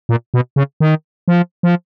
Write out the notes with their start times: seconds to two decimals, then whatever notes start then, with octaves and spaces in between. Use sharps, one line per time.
0.09 A#2
0.34 B2
0.56 C#3
0.80 D#3
1.28 F3
1.63 F3